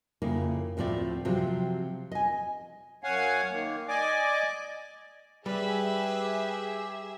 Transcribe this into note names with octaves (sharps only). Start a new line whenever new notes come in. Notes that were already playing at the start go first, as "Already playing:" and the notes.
F2 C#3 A#3 E4
D2 A2 F3 C4 D5 E5
C3 F3 F#3 C4
D#5 G#5
F#2 C#5 F5 F#5 G#5
D#3 A#3
D5 D#5 G#5 D6
G3 G4 G#4 B4 E5